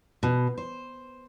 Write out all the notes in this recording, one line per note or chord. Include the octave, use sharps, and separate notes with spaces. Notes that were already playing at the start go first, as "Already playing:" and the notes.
B2
C5